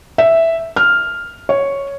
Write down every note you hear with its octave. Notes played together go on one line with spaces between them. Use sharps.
E5
F6
C#5